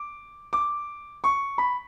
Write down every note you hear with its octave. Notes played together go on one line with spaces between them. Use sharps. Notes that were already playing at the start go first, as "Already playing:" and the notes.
Already playing: D6
D6
C#6
B5